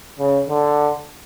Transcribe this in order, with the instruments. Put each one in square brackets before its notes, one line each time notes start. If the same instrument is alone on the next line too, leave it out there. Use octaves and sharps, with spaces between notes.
[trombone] C#3
D3